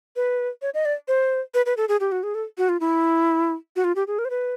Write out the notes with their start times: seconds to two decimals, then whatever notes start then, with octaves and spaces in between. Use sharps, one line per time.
0.16 B4
0.62 C#5
0.74 D#5
0.85 D5
1.08 C5
1.54 B4
1.66 B4
1.77 A4
1.89 G#4
2.00 G4
2.12 F#4
2.23 G#4
2.35 A4
2.58 F#4
2.69 F4
2.80 E4
3.76 F#4
3.84 F4
3.96 G4
4.07 G#4
4.19 A#4
4.25 C5
4.30 B4